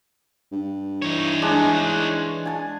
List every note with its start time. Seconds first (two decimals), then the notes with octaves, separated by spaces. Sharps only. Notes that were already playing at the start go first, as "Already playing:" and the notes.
0.52 G2
1.02 E3 D#4 C#5
1.42 G#3 D4
2.45 G#5 A5